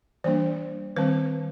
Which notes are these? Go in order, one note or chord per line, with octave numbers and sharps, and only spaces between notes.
E3 G3 A#3 D4 C5
D#3 G3 C4 B4